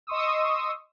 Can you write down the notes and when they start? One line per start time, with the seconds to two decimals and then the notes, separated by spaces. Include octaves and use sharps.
0.07 D#5 C6 C#6 D#6 E6